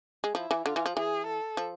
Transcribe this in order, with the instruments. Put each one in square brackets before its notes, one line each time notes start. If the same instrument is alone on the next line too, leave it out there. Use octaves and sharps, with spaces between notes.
[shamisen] G#3
[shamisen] F3 [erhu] E4
[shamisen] E3
[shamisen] D3 [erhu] F4
[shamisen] E3
F3
[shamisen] E3 [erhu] G#4
[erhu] A4
[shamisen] F3